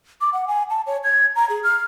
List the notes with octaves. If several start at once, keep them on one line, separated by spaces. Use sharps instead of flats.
D6
F#5
G#5
A5
C#5
G#6
A#5
G#4
F6